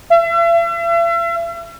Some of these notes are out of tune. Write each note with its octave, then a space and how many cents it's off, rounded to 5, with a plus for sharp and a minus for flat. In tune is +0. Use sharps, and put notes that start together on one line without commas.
E5 +40